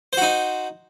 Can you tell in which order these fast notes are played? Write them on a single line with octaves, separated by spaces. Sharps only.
C5 F#4 D#4